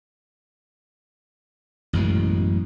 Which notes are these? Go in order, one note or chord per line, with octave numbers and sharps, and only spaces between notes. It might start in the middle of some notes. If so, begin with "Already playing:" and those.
A1 F#2 B2 G#3